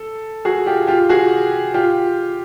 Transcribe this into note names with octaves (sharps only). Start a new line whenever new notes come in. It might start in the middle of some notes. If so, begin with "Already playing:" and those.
Already playing: A4
F#4 G#4
F4 G4
F4 G4
F#4 G#4
F4 G4